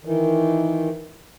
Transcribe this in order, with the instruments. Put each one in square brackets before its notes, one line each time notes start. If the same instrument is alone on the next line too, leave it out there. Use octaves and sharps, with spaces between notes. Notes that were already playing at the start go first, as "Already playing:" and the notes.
[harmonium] D#3 E3